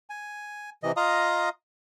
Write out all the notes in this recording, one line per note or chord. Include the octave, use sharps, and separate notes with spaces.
G#5
C3 E3 D#5
F4 D#5 F5 A#5 D#6